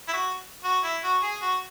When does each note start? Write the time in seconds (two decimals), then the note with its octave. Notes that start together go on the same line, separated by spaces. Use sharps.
0.08 E4
0.13 F#4
0.64 F#4
0.84 E4
1.04 F#4
1.23 G#4
1.42 F#4